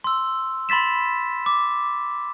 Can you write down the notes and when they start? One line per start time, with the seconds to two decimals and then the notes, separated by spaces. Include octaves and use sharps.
0.04 C6 E6
0.69 B5 C6 A6 B6 E7
1.46 D6